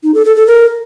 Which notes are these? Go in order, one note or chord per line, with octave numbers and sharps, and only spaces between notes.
D#4
A4
A4
A4
A#4